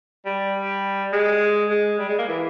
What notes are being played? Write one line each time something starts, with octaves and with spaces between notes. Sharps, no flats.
G3
G#3
G#3
G3
G#3
A#3
E3